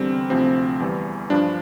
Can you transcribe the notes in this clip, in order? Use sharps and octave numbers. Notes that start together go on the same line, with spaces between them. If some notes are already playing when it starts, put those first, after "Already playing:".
Already playing: E2 D3 G3 C4
D2 C3 F3 C4
E2 E3 G3
G2 F3 D4